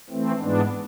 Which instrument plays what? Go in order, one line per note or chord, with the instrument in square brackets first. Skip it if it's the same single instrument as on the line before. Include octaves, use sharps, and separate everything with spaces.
[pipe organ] E3 A3 C4
G#2 E3 G#3 B3 D4